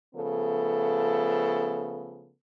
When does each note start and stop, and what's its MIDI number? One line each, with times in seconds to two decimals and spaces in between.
0.14 2.31 49
0.14 2.31 53
0.14 2.31 57
0.14 2.31 59
0.14 2.31 69